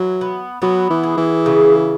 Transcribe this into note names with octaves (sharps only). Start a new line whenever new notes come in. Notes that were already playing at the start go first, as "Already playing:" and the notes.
Already playing: E3 F#3
B3
F#3 B3
E3
G#4
E3
C#3